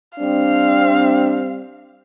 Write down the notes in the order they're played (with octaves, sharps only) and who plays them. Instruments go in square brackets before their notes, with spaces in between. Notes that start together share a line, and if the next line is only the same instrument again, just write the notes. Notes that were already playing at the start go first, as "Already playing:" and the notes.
[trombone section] G3 C4 [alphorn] D4 [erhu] F5